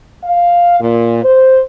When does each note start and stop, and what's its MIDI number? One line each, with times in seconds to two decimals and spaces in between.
0.24 0.77 77
0.80 1.19 46
1.23 1.60 72